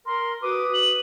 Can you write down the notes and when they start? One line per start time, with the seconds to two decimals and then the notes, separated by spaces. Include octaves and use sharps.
0.06 A#4 C6
0.43 F#4 B4 D6 D#6
0.74 F#7